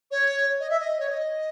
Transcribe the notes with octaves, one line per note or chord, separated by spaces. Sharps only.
C#5
D#5
E5
D#5
C#5
D#5